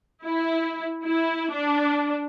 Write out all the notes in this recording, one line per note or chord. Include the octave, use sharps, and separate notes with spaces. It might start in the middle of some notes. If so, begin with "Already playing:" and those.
E4
E4
D4